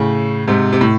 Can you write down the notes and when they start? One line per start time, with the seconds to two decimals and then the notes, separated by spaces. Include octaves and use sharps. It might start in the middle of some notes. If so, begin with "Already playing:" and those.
Already playing: A2 C#3
0.48 G#2 C3
0.73 C3
0.81 A2